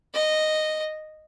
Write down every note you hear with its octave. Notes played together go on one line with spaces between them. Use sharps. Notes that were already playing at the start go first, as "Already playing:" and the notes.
D#5